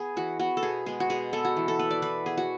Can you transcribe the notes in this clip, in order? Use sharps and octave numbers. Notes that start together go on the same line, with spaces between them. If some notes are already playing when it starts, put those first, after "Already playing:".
Already playing: B3 G#4
E3 F#4
B3 F#4
A4
B2 G#4
G#3 B3 G#4
F#4
B2 G#4
G#3 B3 A4
F#4
E3
A4
B3 B4
D5
E3 B4
B3 G#4
F#4